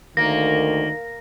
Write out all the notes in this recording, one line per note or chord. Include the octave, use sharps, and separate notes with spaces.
D2 D#3 A#3 A#6